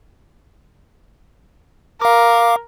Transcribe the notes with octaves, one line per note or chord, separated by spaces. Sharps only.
A#4 F5 D6